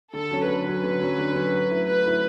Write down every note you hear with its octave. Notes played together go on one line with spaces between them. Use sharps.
D3 A4
F#3 C#4
D3 B4
F#3 C#4
D3
F#3 C#4
D3
F#3 C#4
F#3
A3 E4
F#3 B4
A3 E4